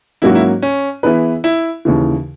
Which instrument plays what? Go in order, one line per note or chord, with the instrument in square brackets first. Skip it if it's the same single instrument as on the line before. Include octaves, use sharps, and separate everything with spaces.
[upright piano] G#2 F#3 A#3 C#4 F#4 [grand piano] E4
[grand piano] E4
C#4
[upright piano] E3 B3 E4 G#4 B4
[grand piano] E4
[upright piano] D#2 C#3 E3